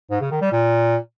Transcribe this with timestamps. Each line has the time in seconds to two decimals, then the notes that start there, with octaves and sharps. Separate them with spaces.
0.11 G#2
0.21 C#3
0.31 D#3
0.41 G3
0.52 A#2